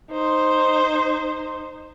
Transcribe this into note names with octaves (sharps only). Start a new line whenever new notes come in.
D#4 C5